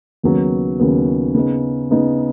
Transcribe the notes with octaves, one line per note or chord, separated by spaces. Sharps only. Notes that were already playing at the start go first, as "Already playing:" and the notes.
D#2 C#3 F#3 B3
D#2 C#3 F#3 B3
C#3 B3 D#4
C#3 B3 D#4